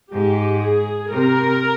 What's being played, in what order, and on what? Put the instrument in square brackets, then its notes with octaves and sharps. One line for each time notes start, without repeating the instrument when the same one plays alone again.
[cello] G#2 [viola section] G4
[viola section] G#4
[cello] C3 [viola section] A#4